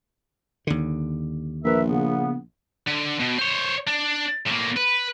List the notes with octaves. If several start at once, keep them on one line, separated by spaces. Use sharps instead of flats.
D#2 D3
A#1 A#4 B4 E5
C#3 B3
D3
B2
C5 C#5
D4
A2 A#3
B4